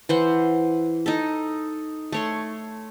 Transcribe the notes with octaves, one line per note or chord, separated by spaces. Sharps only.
E3 C5 F#5
D#4 A4
A3 C#5 C6